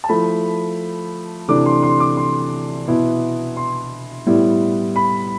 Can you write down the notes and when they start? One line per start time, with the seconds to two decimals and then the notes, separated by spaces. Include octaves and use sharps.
0.04 A5
0.09 F3 A3 E4 B5
1.48 C3 E3 A3 D4 D6
1.66 C6
1.83 C6
2.00 D6
2.17 C6
2.87 B2 B3 E4
3.56 C6
4.27 A2 G3 B3 E4
4.96 B5